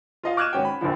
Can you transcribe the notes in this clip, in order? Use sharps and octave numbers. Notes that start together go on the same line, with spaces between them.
F4 D#5 F5
D6 F6 F#6 G#6 D#7 E7
G#1 C#4 F#4 G5
B5
A#1 F2 D3 F3